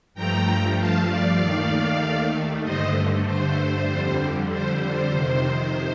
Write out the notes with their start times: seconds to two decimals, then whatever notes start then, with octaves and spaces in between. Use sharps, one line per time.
0.14 G2 F3 A3 G5 A#5
0.77 F5 A5
1.08 D5 F5
1.40 D#2 D#3 A3
2.63 G2 D3 A3 C5 D#5
3.26 C5
3.88 F2 D3 G3
4.50 C5
4.81 C5
5.12 F2 C3 D#3